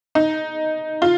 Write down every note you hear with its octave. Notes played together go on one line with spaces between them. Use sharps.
D#4
F4